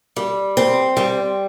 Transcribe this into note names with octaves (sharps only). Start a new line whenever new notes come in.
G3
C4
G3